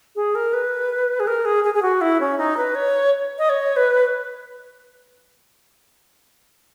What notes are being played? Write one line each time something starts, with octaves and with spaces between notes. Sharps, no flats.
G#4
A#4
B4
G#4
A#4
G#4
G#4
G#4
F#4
E4
C#4
D#4
B4
C#5
D#5
C#5
B4